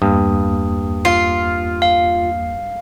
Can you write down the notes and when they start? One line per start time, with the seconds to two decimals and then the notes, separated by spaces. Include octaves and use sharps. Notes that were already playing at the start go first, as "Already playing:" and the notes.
0.02 E2 G2 A#3 D#6
1.05 F4 C7
1.82 F5